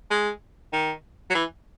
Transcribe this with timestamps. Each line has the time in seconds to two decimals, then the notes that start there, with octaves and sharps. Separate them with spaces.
0.11 G#3
0.73 D#3
1.30 F#3
1.35 E3